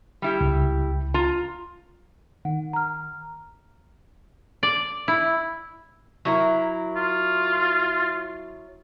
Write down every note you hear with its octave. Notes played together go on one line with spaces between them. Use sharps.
G3 E4 G4
C#2
F4 A#5
D#3 F#5
A#5 F6
D5
E4
F#3 E4 A#4
F4